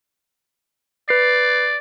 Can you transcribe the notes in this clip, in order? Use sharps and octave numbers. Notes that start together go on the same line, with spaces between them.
B4 D5 C7